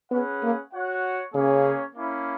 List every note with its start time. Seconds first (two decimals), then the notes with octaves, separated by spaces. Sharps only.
0.11 B3 C#4 G#4 B4 F#5
0.43 A#3
0.73 F#4 C#5 F#5
1.34 C#3 A#3 C#4 G#4 C#5
1.96 A#3 C#4 E4